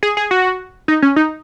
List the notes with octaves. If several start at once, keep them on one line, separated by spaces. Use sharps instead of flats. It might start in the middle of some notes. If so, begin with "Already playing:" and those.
G#4
G#4
F#4
D#4
C#4
D#4